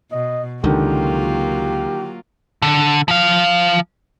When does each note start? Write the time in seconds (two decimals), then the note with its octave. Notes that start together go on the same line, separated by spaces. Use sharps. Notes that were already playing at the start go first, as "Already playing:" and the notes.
0.12 B2 D#5
0.64 C#2 D3 D#3 F#3 A#3 F4 G4
2.62 D3
3.08 F3 F5